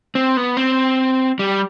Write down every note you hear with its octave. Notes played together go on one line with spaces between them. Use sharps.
C4
B3
C4
G3